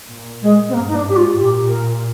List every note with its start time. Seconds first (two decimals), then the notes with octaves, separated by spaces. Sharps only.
0.10 A#2
0.42 G#3
0.69 C4
0.73 G2 A#3
0.88 D#4
0.95 D4
1.05 G#2 G4
1.16 F4
1.37 A#2 G4
1.69 A#4